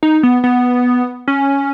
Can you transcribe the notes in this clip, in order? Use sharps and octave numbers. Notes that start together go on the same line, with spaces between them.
D#4
B3
B3
C#4